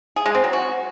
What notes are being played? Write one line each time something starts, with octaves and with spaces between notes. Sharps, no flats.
G#4
G#3
C4
F#3
F#4